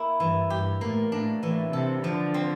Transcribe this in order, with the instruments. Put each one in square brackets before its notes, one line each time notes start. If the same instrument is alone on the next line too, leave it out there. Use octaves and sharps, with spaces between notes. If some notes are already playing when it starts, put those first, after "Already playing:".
Already playing: [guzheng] A#3 E4
[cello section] G2 [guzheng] E3
[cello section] G2 [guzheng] G4
[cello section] A2 [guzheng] A#3
[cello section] A2 [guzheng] D4
[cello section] A2 [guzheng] E3
[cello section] C3 [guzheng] A4
[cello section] D3 [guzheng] F3
[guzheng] C4